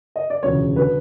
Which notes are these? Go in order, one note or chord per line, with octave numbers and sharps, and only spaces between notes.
D#5
D5
E1 D2 C#3 F3 C#5
D3 F#3 B4